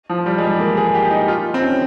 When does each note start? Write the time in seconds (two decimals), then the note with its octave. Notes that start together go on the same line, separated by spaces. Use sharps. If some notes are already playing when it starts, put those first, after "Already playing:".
0.10 F3
0.26 G3
0.38 G#3
0.43 G3
0.60 A#3
0.77 G#4
0.94 G4
1.11 D#4
1.28 F4
1.54 C4
1.62 C#4